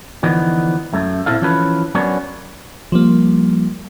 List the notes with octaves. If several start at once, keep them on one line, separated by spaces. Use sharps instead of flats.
D3 E3 F3 B3 D#4
F#2 A3
A#2 D3 C4 E4 A4 F5
E3 F3 C#4 F4 A4 B4
F#3 A#3 B3 C#4 D4 C#5
F3 G3 A#3